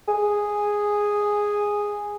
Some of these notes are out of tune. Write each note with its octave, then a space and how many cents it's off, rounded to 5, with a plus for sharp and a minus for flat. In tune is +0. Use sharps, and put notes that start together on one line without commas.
G#4 -5